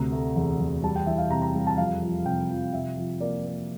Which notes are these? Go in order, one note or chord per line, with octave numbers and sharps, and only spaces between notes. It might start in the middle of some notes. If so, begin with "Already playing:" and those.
Already playing: D2 C3 A#5
A3
E2
E2
G3 A5
G5
E3 E5
F5
C3 A#5
A#5
G3
A5
F2 F5
F3
C3 G5
F3
C3 E5
F3
A#3 D5
A#3